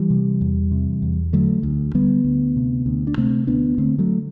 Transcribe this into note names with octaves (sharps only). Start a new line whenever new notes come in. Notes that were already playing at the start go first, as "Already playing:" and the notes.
Already playing: E3 G3
C3
E2
C3
E2
D3 F#3 A3
D2
D3 G3 B3
D2
C3
D2
D4
C3 A3 C4
D2 B3 D4
D3 A3 C4
F#3 A3